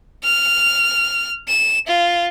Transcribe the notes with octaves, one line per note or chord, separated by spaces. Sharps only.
F6
E7
F4